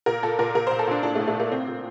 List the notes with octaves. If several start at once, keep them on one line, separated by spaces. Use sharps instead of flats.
A#2 A#4
A#2 A4
A#2 A#4
A#2 A#4
A#2 C5
A4
A#2 D4
A2 D4
A3
A2
A3
A2 A#3
A#2 C4
A#2